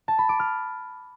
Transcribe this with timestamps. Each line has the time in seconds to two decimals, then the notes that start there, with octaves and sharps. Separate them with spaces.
0.08 A5
0.19 B5
0.29 D6
0.40 F6